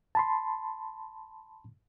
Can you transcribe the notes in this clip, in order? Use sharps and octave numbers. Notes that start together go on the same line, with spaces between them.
A5 B5 C6